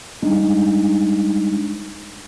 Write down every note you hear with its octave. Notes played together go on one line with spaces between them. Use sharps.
G3 G#3 D4 D#4